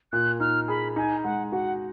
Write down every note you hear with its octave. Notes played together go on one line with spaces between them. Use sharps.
A#2 F#6
D#4 F6
G#4 B5
D#4 G#5
G#3 F#5
F#4 F#5